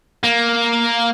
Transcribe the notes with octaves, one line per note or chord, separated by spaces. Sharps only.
A#3